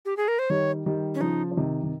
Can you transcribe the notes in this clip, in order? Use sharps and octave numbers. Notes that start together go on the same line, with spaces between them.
G4
G#4
A#4
C5
D#3 G3 C#5
D#3 G3
C#4
C#3 F3 D#4
F3
C3 D#3
D#3